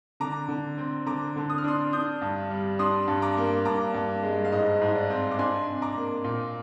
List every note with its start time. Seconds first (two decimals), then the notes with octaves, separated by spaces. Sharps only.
0.20 D3 A#5 D6
0.49 D3
0.78 C4
1.06 D3 A#5 D6
1.36 D3
1.50 D#6
1.58 F6
1.64 D4 C6 D#6
1.93 D4 D#6 G6
2.22 G2
2.50 G3
2.79 D4 C6 D#6
3.08 G2
3.22 A#5 D6
3.37 A#3
3.65 G2 A#5 D6
3.94 G2
4.23 G#3
4.45 F5
4.52 G#2 D#5
4.81 G#2
4.95 D5
5.10 C4
5.31 D6
5.39 D4 G#5 C6
5.68 C3
5.82 A#5 D6
5.96 A#3
6.24 A#2